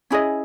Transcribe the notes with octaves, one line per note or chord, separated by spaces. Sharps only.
C#4 E4 G#4 D#5